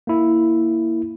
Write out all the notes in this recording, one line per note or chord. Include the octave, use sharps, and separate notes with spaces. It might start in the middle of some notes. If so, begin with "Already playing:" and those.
A#3 E4